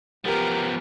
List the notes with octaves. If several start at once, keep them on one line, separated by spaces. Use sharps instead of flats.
F3 B3 G4 A#4